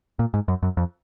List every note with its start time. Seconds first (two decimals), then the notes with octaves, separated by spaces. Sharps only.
0.19 A#2
0.34 G#2
0.48 F#2
0.63 F#2
0.77 F2